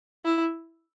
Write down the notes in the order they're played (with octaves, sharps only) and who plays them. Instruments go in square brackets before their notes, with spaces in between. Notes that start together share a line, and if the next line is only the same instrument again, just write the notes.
[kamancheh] E4